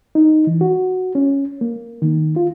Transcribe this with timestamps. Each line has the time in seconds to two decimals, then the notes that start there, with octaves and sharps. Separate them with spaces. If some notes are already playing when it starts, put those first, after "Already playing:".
0.15 D#4
0.47 E3
0.61 F#4
1.15 C#4
1.61 A#3
2.02 D#3
2.36 F4